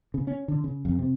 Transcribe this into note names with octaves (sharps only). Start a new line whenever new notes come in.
C#3
C#4
D3
C#3
F2
C3